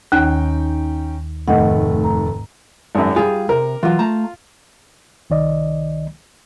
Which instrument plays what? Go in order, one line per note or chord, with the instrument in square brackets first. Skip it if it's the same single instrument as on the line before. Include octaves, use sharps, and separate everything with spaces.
[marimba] D#2 D#3 [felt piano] C#4 D#4 G5
[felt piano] F1 D#3 A3 [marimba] G#2 D#5 F#5
[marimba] A#5
[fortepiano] G#1 F#2
[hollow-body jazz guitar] G3 F4 [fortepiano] G#4
[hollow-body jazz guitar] C3 [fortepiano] A#4
[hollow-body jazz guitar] E3 F#3 [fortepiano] F4 F5
[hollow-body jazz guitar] A3 A5 A#5
[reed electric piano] C2 D#3 D5 D#5